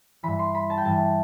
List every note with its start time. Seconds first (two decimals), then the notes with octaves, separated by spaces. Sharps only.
0.23 G2 E3 B5
0.39 C6
0.55 B5
0.70 A5
0.78 G5
0.85 G2 E3 A5